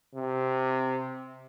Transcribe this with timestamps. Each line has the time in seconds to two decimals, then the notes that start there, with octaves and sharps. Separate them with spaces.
0.15 C3